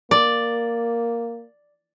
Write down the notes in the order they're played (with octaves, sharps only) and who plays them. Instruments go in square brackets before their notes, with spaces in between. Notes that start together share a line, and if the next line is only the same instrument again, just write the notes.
[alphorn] A#3 [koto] D5